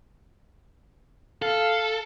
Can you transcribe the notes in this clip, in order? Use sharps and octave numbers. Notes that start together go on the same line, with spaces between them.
A4 F5